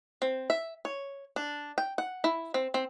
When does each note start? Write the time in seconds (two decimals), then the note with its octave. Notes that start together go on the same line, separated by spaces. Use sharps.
0.22 C4
0.50 E5
0.85 C#5
1.36 D4
1.78 G5
1.98 F#5
2.24 E4
2.54 C4
2.74 C4